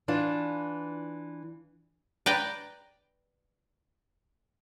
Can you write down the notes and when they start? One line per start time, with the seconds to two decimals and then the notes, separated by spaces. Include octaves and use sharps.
0.08 E3 D4 F4
2.26 B4 D5 G5 A#5